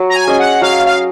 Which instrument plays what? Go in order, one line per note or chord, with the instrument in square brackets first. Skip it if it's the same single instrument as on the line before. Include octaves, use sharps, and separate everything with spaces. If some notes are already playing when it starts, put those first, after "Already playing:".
Already playing: [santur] F#3
[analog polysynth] A#5
G#5
[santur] C#4 G#4 D#5
[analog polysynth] F#5
[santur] F#3 [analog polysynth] F5
[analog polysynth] F5